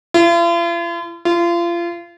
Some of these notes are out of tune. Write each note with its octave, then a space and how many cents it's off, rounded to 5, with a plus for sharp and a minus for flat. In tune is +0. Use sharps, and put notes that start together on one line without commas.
F4 -45
F4 -30